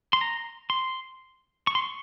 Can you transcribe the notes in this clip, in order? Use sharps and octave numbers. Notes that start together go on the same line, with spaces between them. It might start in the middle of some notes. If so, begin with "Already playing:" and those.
C6
A#5
C6
C#6
C6
C#6